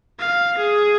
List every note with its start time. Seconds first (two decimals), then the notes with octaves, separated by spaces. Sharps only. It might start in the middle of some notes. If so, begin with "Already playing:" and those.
0.19 F5
0.58 G#4